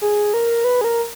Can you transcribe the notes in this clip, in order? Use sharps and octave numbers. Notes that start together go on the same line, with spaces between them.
G#4
A#4
B4
G#4
A#4